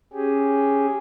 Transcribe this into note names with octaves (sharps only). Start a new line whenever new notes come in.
C#4 G4 G#4